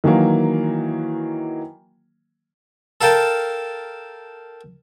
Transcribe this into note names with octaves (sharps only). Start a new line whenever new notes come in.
D#3 E3 F#3 A#3
A4 A#4 F5 G5 A5